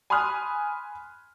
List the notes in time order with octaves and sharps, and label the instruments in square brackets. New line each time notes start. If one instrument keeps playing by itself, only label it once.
[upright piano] G#5 B5 C6 D#6 F6 F#6